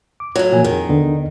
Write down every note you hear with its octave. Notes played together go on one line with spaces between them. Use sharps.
D6
A2 F#3 F4
A#2 F3 G#5
F2 D#3 G#4
D#2 D3 B3